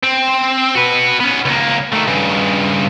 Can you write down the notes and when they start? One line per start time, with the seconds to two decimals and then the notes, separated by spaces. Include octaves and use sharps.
0.03 C4
0.75 F#4 B4
1.20 B3 C#4
1.45 C#2 A#3
1.92 D#3 A3
2.07 G2 C#3